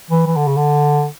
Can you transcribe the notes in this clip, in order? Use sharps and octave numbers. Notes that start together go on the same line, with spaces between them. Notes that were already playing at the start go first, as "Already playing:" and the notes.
E3
E3
D3
C#3
D3